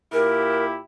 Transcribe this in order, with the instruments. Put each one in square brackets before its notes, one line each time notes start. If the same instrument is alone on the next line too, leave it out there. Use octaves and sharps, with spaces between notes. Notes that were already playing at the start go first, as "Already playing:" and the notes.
[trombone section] A#2 E4 G4 [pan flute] A#4